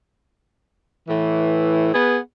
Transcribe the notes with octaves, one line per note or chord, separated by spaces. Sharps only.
A2 E3
B3 G#4 B4